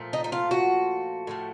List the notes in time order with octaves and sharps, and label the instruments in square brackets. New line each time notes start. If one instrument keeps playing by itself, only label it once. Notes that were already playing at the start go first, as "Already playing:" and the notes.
Already playing: [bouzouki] A#2 F3 A3
D#4
D#4
F4
F#4
A2 F3 A3